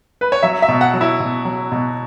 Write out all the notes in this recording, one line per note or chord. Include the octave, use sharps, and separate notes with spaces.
B4
C#5
F#3 E5
E5
B2
F#5
F#3
E4
B2
F#3
B2